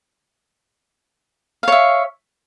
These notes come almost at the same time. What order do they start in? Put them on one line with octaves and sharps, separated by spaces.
F5 C#5 E5